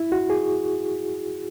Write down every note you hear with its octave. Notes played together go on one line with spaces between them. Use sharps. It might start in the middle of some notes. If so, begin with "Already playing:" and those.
Already playing: E4
F#4
G#4